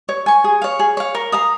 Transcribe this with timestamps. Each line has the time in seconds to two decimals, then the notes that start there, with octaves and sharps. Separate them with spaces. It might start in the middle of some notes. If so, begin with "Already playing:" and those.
0.09 C#5
0.26 G#5 C#6
0.44 G#4
0.62 C#5 F5
0.79 G#4
0.97 C#5 F5
1.15 A#4
1.32 F5 A#5 D#6